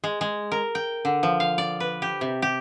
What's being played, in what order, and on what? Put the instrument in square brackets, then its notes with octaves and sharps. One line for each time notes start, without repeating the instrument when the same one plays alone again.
[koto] G#3
G#3
A#4
G5
D3
F3
F5
D5
B4
G4
C3
G4